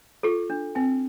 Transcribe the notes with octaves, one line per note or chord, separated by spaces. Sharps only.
F4 A4
D4
C4 G5